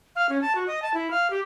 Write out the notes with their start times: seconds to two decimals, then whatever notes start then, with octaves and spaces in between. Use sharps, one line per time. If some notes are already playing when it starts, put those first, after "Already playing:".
0.16 F5
0.29 C#4
0.42 A5
0.55 F#4
0.67 D#5
0.82 A5
0.94 E4
1.11 F5
1.30 G4